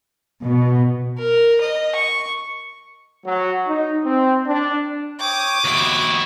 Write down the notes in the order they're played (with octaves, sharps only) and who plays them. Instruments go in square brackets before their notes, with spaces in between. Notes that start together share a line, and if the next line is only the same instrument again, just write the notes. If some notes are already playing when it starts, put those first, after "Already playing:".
[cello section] B2
[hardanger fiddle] A#4
D#5
C#6
[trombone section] F#3
D#4
C4
D4
[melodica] C#5 G5 [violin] D6 D#6
[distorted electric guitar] D#2 E4 [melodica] F#4